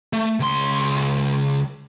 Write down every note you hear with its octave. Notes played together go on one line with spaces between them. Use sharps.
A3
C#2 C6